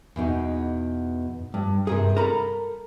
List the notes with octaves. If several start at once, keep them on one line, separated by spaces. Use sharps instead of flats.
E2 B2 D#4
G2
G2 C3 G#4 A#4
A4 A#4 A#5 B5